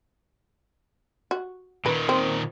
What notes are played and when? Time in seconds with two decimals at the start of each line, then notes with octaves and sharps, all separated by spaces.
1.31 F#4
1.86 A#2 D#3 B4
2.09 C4